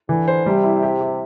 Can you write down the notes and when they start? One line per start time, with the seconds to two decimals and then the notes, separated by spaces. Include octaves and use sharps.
0.09 D3 E3
0.28 C5
0.46 C3 G3
0.64 E4
0.83 G4
1.01 G4